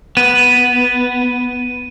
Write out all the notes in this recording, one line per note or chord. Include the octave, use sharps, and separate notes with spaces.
B3 D#7